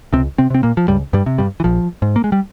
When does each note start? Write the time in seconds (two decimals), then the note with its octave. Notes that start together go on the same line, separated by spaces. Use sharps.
0.13 C#2 C3 C4
0.38 C3 C4
0.50 C3 C4
0.63 A#2 A#3
0.77 F3
0.88 C#2 G2 G3
1.13 G2 G3
1.26 C3
1.38 G2 G3
1.60 E3
1.64 A#1 F3
2.02 G#2
2.16 A#3
2.24 G#3
2.32 G3